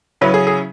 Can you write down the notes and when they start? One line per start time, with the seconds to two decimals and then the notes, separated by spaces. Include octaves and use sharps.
0.21 C#3 F#3 C#4 E4 B4
0.34 G#4
0.47 G#4